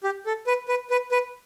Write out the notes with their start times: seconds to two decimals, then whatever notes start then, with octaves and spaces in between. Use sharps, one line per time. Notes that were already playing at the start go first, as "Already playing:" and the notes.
0.04 G4
0.26 A4
0.47 B4
0.69 B4
0.90 B4
1.12 B4